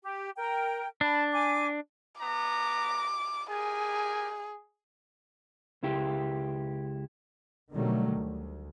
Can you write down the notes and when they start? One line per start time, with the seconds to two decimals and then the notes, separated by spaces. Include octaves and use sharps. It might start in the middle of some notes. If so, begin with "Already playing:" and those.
0.04 G4
0.37 A#4 G5
1.01 D4 A5 B5
1.33 G#5 D6
2.20 B3 A#5 D6
3.50 G4 G#4 A#4 G#5
5.83 C#2 E4 G4
7.72 B2 D3 D#3 F#3 G3 A3
8.15 D2